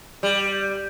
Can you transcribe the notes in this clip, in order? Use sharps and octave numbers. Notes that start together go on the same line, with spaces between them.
G3